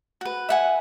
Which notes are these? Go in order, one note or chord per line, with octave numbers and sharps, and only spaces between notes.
F#4 B4
E5 F#5 G#5